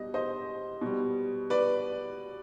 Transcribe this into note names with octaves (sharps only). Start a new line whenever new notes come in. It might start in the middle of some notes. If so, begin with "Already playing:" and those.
Already playing: B2 G3 D#5
C5 D#5
B2 G3
B4 D5